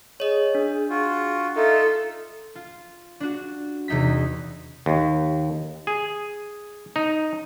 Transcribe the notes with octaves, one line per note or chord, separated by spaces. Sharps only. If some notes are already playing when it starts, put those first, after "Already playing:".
G#4 C#5 D#5
D4
F4 F#4
D#4 F4 A4 E5
F4
D4 F#4
E2 C3 D#4 E4 B6
D#2
G#4
D#4